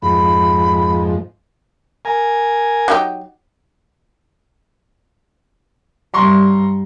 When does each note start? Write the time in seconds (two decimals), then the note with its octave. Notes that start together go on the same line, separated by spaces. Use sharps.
0.02 F2 G#2 B5
2.05 A#4 G#5
2.88 F#3 D#4 G4
6.14 G2 G3 A#5 C6 C#6